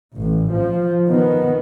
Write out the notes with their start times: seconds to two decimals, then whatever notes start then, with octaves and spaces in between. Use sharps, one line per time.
0.19 A1
0.54 F3
1.07 D#3 B3